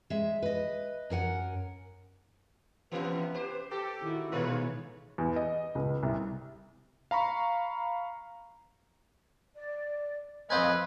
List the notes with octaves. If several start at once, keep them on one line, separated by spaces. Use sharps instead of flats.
G#3 E5
B4 D#5
F#2 A#4 F#5 G#5
C3 E3 B3 C#4 B4
G4 C5
G4 A4
D#3 E4 F#4
G#2 B2 D#3 E3 B3 F4 B4 C#5
E2
D#5
C#2
C2
F5 A#5 B5 C#6
D5
F2 B4 C5 D#5 F5 G#5 E6